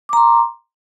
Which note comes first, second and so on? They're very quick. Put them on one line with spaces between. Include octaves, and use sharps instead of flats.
D6 A#5 C6